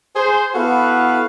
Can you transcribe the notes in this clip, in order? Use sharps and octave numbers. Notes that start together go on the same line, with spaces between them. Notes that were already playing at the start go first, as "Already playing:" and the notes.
G#4 C5
B3 E4 F#4 A4 B4 F5